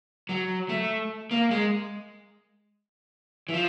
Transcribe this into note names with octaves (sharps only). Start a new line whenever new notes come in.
F#3
A3
A#3
G#3
E3
F3